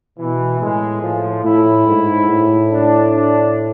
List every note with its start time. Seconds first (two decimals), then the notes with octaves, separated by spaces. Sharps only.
0.18 B2 E3
0.60 A2 G#3
1.02 A2 F3
1.44 A2 E4
1.87 G#2
2.29 A2
2.71 D4
3.14 D4